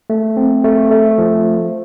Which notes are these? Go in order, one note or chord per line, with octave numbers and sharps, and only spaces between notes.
A3
C4
A3
A3
F3